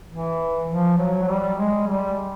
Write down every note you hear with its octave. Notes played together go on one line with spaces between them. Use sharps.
E3
F3
F#3
F#3
G3
G#3
G3